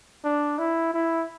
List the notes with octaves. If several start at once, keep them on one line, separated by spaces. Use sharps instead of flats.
D4
E4
E4